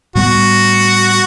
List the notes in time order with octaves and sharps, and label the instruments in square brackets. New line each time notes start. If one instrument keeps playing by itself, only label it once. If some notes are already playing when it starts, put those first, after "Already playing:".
[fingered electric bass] A2 G3 B3 [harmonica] F#4